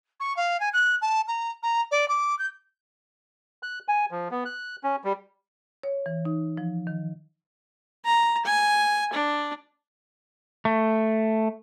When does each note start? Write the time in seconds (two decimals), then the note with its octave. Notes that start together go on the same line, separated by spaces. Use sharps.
0.20 C#6
0.37 F5
0.60 G#5
0.73 F#6
1.02 A5
1.28 A#5
1.63 A#5
1.91 D5
2.08 D6
2.39 G6
3.63 F#6
3.88 G#5
4.11 F3
4.31 B3
4.45 F#6
4.84 C#4
5.04 G3
5.83 C#5
6.06 E3
6.25 D#4
6.57 F3
6.87 D#3
8.05 A#5
8.45 G#5
9.13 D4
10.65 A3